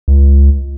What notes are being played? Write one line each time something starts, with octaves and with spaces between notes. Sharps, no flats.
C#2